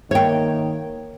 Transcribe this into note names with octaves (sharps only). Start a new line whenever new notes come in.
D#3 A#3 C#5 G5